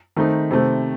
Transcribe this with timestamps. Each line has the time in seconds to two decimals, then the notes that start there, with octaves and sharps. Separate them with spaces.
0.17 D#3 A3 C4 D#4
0.51 C3 D#3 A3 C4